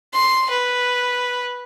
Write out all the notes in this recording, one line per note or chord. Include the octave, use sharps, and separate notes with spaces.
C6
B4